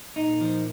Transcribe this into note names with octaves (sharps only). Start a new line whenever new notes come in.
A#2 A#3 D#4
F3